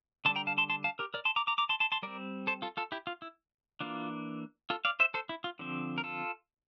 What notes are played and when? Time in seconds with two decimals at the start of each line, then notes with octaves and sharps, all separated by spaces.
0.25 D3 G3 D4 A5 C6
0.36 G5 A#5
0.47 F5 A5
0.58 A5 C6
0.70 A5 C6
0.84 F5 A5
0.99 G4 A#4
1.14 A#4 D5
1.25 A5 C6
1.36 A#5 D6
1.47 A#5 D6
1.58 A#5 D6
1.69 A5 C6
1.80 A5 C6
1.92 A5 C6
2.02 G3 C4 A#4 D5
2.47 A4 C5
2.62 F4 A4
2.77 F4 A4
2.92 E4 G4
3.07 F4
3.22 E4
3.80 E3 A#3 D4 F4
4.70 F4 A4
4.85 D5 F5
5.00 C5 E5
5.14 A4 C5
5.29 E4
5.44 F4
5.59 D3 F3 C4
5.98 A#4
6.04 F4 A4